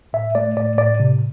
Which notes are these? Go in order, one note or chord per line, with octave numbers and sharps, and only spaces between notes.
A2 E5
A3 D5
A2 D5
A2 D5
C3